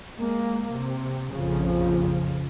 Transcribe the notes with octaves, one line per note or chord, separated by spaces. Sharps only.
G#3 A#3
C3
A#1 F2 C#3 F3